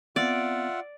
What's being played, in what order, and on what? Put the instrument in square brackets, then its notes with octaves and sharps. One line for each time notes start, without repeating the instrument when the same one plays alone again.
[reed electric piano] B3 C4 [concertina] F4 E5 F#5 [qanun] D5